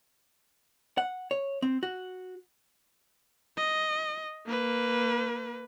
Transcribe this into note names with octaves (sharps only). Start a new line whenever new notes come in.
F#5
C#5
C4
F#4
D#5
A#3 B4